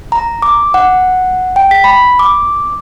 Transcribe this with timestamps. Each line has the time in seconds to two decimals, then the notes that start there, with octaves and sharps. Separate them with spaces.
0.12 A#5
0.42 D6
0.74 F#5
1.56 G5
1.71 B6
1.84 B5
2.19 D6